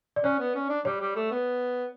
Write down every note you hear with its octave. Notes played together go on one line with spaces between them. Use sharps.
D5
C#4 C#5
B3
C#4
D4
G3 C#5
G3
A3
B3